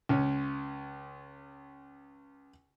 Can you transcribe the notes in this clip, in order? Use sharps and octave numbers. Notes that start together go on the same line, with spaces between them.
C#2 C#4 C#5